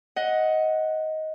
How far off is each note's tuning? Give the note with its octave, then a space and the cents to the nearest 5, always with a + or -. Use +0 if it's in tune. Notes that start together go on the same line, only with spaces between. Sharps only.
D#5 +15 F#5 +0